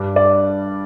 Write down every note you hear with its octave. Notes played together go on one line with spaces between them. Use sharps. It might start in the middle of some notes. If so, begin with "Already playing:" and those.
Already playing: G2 G3 D4
D5